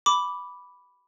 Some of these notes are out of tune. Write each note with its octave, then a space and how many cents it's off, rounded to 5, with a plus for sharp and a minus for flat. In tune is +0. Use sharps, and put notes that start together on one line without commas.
B5 +0 D6 -10